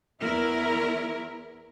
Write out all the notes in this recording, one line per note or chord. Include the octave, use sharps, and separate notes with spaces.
E2 E4 A#4